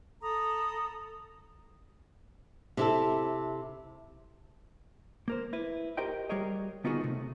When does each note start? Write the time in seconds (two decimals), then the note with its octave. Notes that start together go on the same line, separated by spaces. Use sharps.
0.22 A4 A#5 B5 D#6
2.77 C3 E4 A4
5.28 A#3 A#4 C5
5.53 E4 B4
5.97 F#4 G4 A#4 C5 D#5 G5
6.29 G3 F#4 G#4 A#4 C#5 D#5
6.84 D3 B3 D#4 F4 F#4 G#4
7.01 C3 A3